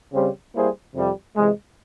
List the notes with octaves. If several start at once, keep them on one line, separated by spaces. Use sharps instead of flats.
C#3 G3 C4 G4 C5
G3 A#3 E4 G#4 C5
F2 C3 G3
C3 E3 G#3